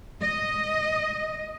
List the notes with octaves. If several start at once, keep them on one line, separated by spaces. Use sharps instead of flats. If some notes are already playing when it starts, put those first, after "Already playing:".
D#5